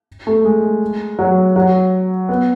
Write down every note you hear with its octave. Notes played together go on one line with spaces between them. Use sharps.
A3
G#3
F#3
F#3
B3